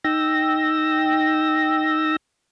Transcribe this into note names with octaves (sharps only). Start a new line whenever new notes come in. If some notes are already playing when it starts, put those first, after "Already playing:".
D#4 G5 E6 A#6